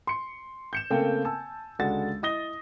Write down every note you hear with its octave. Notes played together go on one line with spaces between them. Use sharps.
C6 C#7
G6 C#7 E7
C#3 A3 A#3 C4 G5
G#5 A5 E6
C#2 D3 G#3 F#4 A6
E4 D#5 D#6 A#6 G7